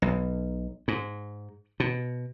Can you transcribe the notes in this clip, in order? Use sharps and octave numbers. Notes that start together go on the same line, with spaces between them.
B1
G#2
B2